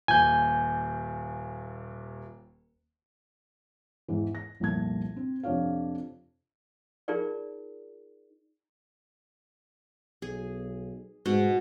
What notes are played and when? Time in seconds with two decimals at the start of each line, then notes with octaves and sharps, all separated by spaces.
0.08 D#1 D#2 G#5 G6
4.08 E2 G#2 E3
4.35 A#6
4.60 F1 C2 A#2 A5 G#6
5.16 C4
5.43 F2 C3 D4 F4 C#5 F5
7.08 D#4 F4 G#4 A#4 D5
10.22 B1 G#4
11.26 G#2 B2 F#4